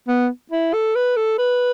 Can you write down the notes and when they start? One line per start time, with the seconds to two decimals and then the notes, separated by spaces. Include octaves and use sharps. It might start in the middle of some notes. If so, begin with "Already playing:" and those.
0.08 B3
0.52 E4
0.73 A4
0.95 B4
1.16 A4
1.38 B4